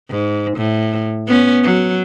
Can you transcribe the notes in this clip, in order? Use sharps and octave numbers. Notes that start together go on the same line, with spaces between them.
G#2
A2
B3 C#4
F#3